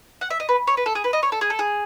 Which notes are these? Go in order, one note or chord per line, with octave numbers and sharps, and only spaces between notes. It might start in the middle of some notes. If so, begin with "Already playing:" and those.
F#5
E5
D#5
B4
C#5
B4
A4
G#4
B4
D#5
C#5
A4
G#4
A4
G#4